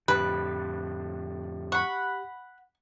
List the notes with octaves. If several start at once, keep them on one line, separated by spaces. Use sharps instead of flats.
F2 A2 D3 G4 B4
F#5 B5 C#6